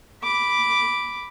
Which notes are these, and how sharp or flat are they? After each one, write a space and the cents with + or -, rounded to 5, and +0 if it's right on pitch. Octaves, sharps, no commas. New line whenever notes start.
B5 +0 D6 +0